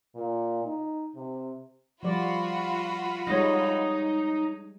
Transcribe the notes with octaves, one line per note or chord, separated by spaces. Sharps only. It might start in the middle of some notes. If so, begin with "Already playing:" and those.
A#2
D#4
C3
F3 G3 F4 F#4 D5 B5
G3 G#3 D#4 C#5 D#5 A#6